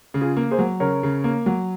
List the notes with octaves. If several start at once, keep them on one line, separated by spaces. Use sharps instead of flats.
C#3
F4 G#4
A#3
G#4 C5
F#3
C#3 A#4 C#5
C#3
A#3
F#3